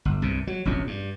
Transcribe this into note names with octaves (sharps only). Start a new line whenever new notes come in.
G1
C2 G2 C3
F#3
F1 A#1 E2 C#4
G2